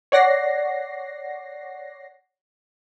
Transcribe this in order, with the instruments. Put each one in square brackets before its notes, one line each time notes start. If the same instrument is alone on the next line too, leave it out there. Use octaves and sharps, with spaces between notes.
[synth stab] C#5 D5 F#5 A#6 C7